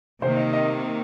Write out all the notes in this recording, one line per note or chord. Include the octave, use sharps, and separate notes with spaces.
C3 D#3 A#3 C5
D#5
D#5